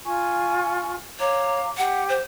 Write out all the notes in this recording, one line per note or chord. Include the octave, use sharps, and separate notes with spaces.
F4 G#5 C#6
C#5 F5 A#5 D6
G4 F#5
C5